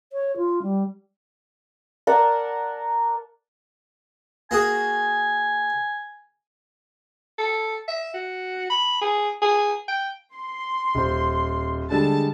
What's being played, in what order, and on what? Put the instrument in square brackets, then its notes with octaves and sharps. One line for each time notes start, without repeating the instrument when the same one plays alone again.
[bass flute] C#5
F4
G3
[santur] A#4 D5 F#5 A5
[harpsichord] A#3 F#4 G#4 [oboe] G#5
[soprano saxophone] A4
E5
F#4
B5
G#4
G#4
G5
[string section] C6
[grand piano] D#1 C5
[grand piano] D3 G3 G#3 [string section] A5